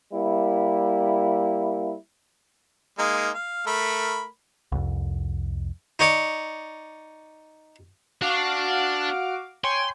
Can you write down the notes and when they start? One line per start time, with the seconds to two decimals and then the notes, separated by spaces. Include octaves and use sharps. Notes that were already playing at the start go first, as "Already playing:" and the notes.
0.13 G3 A#3 E4
2.99 G#3 A#3 D#4
3.34 F5
3.67 A3 A#4 B5
4.72 C2 F2
5.99 D#4 C#5 D5
8.22 D4 F#4 F5 D6
9.64 C#5 G5 G#5 C6